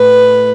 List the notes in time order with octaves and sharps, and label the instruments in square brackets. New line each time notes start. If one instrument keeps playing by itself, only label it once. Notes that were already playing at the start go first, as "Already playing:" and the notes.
Already playing: [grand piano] A2 [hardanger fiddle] B4